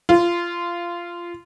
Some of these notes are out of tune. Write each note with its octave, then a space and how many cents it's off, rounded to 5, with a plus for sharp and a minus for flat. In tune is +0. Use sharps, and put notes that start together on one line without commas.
F4 -15